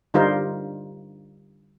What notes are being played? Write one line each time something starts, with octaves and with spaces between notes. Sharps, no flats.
D3 G3 D#4 F4 A#4 C5